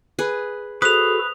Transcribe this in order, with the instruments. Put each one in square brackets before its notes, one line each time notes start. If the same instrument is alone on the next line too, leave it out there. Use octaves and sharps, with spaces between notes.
[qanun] G#4 B4
[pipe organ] F#4 G#4 A4 [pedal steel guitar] B4 [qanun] C5 [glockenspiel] D#6 F7